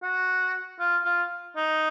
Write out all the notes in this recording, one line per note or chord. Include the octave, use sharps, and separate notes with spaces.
F#4
F4
F4
D#4